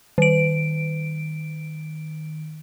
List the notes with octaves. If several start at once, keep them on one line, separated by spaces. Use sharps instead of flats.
D#3 D7